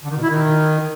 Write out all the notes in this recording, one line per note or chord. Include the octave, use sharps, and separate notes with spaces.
D3
D#3
B2
E4
D#3